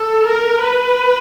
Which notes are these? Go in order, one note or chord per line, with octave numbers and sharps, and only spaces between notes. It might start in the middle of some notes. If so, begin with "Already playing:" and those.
Already playing: A4
A#4
B4